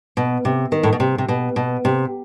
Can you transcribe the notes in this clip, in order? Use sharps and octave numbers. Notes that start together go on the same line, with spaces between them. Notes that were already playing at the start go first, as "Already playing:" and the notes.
B2
C3
D#3
A2
B2
C3
C3
B2
B2
C3